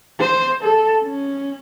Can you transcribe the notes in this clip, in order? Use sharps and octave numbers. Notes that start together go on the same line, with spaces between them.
C5
A4
C#4